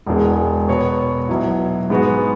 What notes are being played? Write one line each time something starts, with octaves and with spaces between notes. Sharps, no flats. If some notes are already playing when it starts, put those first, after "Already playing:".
E1 E2 E3 G#3
B2 B3 F#4 C#5
B1 B2 F#3 E4
G#2 G#3 B3 F#4